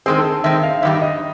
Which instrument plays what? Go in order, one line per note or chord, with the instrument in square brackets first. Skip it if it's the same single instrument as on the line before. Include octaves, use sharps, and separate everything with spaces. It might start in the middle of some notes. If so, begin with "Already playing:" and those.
[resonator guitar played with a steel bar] D#3 G#3 C4 [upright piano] G#4
[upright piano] A4
[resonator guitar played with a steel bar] D#3 G#3 C4 [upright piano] E5
[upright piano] F5
[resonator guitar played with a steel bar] G2 D#3 G3 [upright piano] E5
[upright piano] D#5